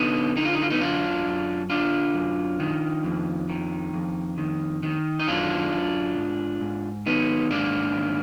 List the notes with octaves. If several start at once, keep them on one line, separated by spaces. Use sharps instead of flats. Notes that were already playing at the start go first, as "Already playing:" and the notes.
Already playing: D3 B3 D#4
D3 D#4
F4
D#4
F4
B3 D#4
F#2 D4 F4
F#2
D3 D4 F4
F#2
D#3
F2
D#3
F2
D#3
D#3
D#4
F#2 D4 F4
F#2
G#2
G#2
D#3 B3 D#4
G#2 A#3 D4
D#3